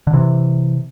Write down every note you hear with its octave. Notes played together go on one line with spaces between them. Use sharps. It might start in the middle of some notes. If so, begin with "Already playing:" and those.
D3
C3 E3